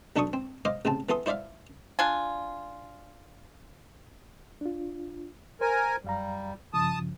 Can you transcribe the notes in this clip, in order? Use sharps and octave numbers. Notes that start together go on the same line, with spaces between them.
B1 D4 A4 A5 C#6 D#6
C4
C5 D#5 F5 D6
A1 C#3 C4 A5
E3 B3 A4 C6 D#6
E4 C5 D5 E5 F5
D4 F4 G#5
D4 F4
A#4 C5 G#5
F#2 G3 F5 A#5
G2 C#3 F3 A5 D#6